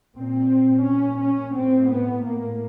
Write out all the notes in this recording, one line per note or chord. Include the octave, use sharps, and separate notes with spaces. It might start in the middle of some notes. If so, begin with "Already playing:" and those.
A#2 C4
A#2 C#4
C#4
A2 C4
B3
A2 A#3